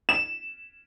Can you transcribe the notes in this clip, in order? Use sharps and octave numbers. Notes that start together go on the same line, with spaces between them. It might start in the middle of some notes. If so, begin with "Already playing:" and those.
E7